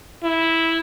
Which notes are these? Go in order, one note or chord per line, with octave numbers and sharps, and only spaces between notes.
E4